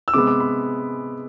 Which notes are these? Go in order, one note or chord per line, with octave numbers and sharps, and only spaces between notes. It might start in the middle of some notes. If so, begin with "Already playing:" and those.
E6
C3 G#3 B3 D6
D6
B5